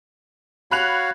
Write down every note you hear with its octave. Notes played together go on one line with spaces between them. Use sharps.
F#4 C#5 F5 B5 F#6 F7